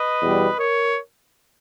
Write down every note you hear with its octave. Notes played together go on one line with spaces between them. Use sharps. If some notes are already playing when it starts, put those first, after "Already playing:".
Already playing: B4 D#5
E2 B2 G3
A#4 C#5